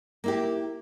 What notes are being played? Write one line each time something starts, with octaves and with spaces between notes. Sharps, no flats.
A#3 E4 G4